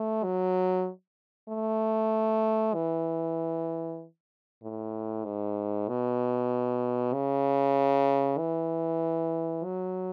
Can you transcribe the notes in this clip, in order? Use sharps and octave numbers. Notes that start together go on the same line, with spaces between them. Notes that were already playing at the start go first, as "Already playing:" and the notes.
Already playing: A3
F#3
A3
E3
A2
G#2
B2
C#3
E3
F#3